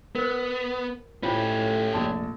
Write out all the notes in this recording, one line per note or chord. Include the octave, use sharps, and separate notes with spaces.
B3 A#4 C5
A2 C#4 F4 G4 C5 C#5
F1 A#1 A5